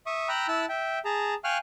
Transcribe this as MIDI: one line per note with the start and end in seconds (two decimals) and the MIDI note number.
0.06 0.28 76
0.06 0.28 85
0.06 0.28 87
0.29 0.47 79
0.29 0.47 82
0.29 0.47 83
0.29 0.47 88
0.29 0.47 90
0.48 0.65 64
0.48 0.65 81
0.48 0.65 88
0.48 0.65 90
0.69 0.99 76
0.69 0.99 79
1.05 1.34 68
1.05 1.34 81
1.05 1.34 82
1.44 1.58 77
1.44 1.58 79
1.44 1.58 80
1.44 1.58 85
1.44 1.58 89
1.44 1.58 90